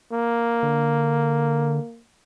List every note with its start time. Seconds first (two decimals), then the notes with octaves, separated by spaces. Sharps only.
0.12 A#3
0.63 D3